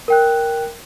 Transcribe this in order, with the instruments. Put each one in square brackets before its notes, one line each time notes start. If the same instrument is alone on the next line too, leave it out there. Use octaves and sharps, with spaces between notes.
[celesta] A#4 G5 F#6